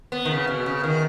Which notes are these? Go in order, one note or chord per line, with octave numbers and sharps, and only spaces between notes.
B3
D#3
C#3
B2
C#3
D#3